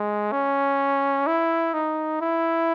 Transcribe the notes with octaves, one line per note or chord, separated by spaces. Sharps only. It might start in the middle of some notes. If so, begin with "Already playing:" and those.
Already playing: G#3
C#4
E4
D#4
E4